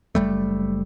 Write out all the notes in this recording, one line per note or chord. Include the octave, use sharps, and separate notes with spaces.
F#1 G2 G3 A3